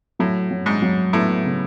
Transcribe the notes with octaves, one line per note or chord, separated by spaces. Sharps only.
A2 F#3
F#3
G#2
F#3
A2 B3
C#3